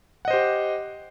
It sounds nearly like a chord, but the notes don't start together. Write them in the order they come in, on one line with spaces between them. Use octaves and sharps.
F#5 D#5 C5 G4